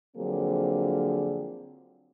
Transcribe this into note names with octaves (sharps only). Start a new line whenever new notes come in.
D3 F3 F#3 A#3 C4 G#4